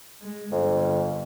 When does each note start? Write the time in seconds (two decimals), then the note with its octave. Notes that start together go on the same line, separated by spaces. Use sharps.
0.22 G#3
0.52 G1 F2